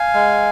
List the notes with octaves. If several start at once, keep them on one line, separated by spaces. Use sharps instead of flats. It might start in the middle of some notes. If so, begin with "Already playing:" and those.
Already playing: F5 G#5
G#3